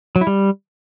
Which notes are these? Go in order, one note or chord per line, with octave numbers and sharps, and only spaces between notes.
F#3
E4
G3